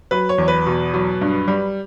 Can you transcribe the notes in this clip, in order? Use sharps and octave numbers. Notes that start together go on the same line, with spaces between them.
F#3 B4
C#5
E2
B4
B2
F#3
G2
G3